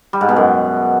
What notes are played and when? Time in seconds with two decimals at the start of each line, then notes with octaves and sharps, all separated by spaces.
0.13 G3
0.21 G#2
0.29 B2
0.36 F#2